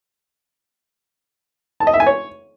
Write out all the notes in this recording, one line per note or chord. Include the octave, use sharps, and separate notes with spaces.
A5
D#5
E5
G#5
C#5